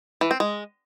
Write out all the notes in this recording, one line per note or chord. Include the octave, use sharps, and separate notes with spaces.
E3
C4
G#3